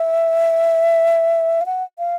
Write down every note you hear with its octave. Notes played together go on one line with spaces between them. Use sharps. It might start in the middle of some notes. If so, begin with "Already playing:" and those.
Already playing: E5
F5
F#5
F5